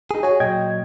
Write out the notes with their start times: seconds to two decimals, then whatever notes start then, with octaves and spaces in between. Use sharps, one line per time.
0.11 D#4 G#4
0.23 F#4 G#4 C#5
0.40 A#2 F#3 D#5 G5 G#6